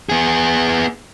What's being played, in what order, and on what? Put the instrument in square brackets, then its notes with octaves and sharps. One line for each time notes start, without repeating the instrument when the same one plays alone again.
[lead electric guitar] B3 G#4